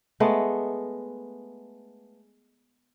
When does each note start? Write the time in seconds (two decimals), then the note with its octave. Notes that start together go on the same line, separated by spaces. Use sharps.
0.20 G#3 A3 B3